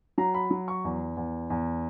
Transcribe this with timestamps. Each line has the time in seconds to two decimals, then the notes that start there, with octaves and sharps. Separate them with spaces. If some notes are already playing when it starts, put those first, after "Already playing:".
0.18 F#3 A#5
0.34 B5
0.50 F#3
0.68 C#6
0.84 E2
1.17 E2
1.50 E2